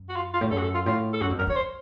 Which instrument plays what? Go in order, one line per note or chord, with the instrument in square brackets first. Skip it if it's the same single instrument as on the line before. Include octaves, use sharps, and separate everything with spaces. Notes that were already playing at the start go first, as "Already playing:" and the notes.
Already playing: [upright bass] F#2
[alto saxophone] F#4
F4
F4
[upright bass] A2
[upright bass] F#2 [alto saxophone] A4
[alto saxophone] F#4
A4
F4
[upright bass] A2 [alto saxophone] F4
[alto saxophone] A4
[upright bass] F#2 [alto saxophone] F#4
[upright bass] F2
[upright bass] F#2 [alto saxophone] A#4
[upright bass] F2 [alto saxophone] C#5
[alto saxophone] C5